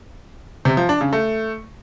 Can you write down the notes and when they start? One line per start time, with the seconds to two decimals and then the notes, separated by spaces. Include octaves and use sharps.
0.65 C3
0.77 F3
0.89 D4
1.01 C#3
1.13 A3